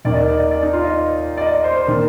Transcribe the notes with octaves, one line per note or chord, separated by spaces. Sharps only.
D#2 D#3 A#3 D5
D#5
D5
D5
D#5
D5
D#4
F4
D#5
D5
D5
D#5
D5
C5
C5
D#3 A#3 A#4